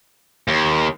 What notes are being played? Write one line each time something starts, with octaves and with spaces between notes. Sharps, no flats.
D#2